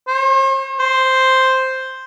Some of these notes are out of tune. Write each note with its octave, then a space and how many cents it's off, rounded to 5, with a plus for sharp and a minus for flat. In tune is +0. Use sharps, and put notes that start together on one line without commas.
C5 +45
C5 +0